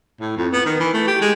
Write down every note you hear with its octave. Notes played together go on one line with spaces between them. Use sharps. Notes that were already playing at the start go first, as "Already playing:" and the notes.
A2
F2
B3
D#3
E3
A3
G4
G#3